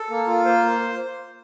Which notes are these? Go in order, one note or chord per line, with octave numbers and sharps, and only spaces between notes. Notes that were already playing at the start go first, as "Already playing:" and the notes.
Already playing: A4
A#3
F4
A#3 C5